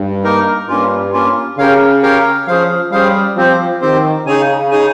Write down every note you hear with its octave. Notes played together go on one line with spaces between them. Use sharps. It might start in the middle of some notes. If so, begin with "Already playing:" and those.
Already playing: G2
A#3 D#4 A#4
G2 A#3 C#4 F4
A#3 C#4 F4
C#3 C#4 G4 A#4 C#5 F5
C#4 G4 A#4 C#5 F5
F3 C#4 G#4 C5 F5
G3 C#4 G#4 C5 F5
F3 C4 G4 C5
D#3 C4 G4 C5
C#3 D#4 G#4 C#5 G#5
D#4 G#4 C#5 G#5